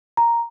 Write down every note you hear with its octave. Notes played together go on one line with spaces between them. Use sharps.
A#5